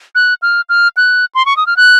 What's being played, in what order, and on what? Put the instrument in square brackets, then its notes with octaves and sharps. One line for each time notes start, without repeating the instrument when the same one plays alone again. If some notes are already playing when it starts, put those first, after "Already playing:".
[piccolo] F#6
F6
F6
F#6
C6
C#6
D#6
F6
F#6